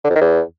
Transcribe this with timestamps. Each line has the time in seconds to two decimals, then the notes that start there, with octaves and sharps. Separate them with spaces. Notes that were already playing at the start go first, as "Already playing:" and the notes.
0.05 D3
0.10 F2
0.16 D#3
0.21 E2